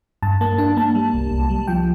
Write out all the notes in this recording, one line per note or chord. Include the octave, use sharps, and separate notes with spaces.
G2 A5
A#3 A5
D4 A5
A#3 A5
G3
C2
C2
G3
F3 G5